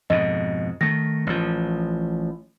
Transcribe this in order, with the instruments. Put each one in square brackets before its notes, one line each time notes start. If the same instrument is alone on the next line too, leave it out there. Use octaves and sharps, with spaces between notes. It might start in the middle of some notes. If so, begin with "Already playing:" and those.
[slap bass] F2 G#2 B2 [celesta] D#5
[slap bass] D#3 A3 [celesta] A#6
[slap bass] A1 F3